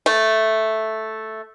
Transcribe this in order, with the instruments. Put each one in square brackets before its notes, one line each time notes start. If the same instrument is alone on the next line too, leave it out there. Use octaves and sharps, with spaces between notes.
[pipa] A3